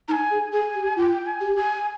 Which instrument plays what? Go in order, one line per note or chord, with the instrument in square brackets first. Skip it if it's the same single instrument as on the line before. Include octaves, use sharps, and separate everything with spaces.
[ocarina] D#4 [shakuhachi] A#5
[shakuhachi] G#5
[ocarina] G#4
[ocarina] G#4 [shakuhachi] G#5
[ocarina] G4
[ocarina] F4 [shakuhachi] G5
[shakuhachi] G#5
[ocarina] G4
[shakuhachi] G#5